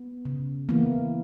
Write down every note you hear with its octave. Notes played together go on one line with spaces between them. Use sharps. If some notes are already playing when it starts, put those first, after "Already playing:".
Already playing: B3
C#3
E3 A#3 B3